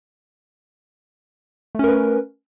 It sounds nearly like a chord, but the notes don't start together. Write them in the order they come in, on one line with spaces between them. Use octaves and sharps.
A3 C#4 A#4 B4